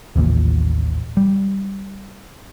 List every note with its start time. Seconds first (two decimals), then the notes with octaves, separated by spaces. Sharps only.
0.16 D#1 A1 D#2 A#2
1.17 G3